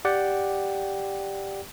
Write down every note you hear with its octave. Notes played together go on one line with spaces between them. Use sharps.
G4 D5 F#5 G5